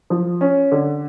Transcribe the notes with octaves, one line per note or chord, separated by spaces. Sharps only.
F3
C#4
D3